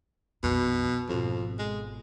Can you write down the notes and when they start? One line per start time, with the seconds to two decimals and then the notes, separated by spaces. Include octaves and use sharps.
0.43 A#1 F2 B2
1.09 G#1 F2 B2
1.59 G#3